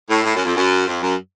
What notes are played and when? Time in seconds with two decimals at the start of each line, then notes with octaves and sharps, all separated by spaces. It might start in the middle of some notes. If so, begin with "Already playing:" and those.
0.10 A2
0.24 A2
0.35 F#2
0.45 F2
0.56 F#2
0.87 F2
1.02 F#2